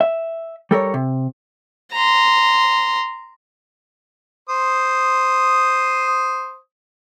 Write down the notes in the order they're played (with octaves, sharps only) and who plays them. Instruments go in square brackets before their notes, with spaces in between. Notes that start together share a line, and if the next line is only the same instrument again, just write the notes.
[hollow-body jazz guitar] E5
G3 A4 A#4 C#5
C3
[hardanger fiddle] A#5 C6
[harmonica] C5 D#6